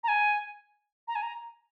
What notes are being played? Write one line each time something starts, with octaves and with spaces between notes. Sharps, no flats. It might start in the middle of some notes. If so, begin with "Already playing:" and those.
A#5
G#5
A#5
G#5
A#5